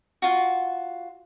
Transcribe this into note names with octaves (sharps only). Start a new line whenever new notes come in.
F4 F#4